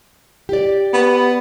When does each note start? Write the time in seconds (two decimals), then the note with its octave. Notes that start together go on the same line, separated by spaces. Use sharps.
0.49 G4 D5
0.93 B3